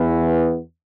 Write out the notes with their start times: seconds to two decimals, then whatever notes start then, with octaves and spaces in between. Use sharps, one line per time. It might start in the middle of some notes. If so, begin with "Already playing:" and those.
Already playing: E2 E3 B3